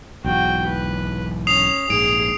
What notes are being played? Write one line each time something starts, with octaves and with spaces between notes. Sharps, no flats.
B1 E2 G#2 F#4 G5
B4
C#4 D#6 C7 F7
A#1 G#2 G#4 D7